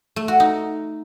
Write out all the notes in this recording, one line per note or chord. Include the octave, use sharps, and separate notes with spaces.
A3
F#4
D#4